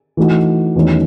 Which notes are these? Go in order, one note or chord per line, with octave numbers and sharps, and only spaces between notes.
E3 A3 D#4 F#4
E2 D#3 F#3 A3 C#4